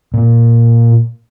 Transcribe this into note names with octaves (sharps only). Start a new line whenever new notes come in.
A#2